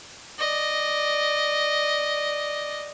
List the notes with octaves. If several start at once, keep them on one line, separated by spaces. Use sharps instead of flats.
D5 D#5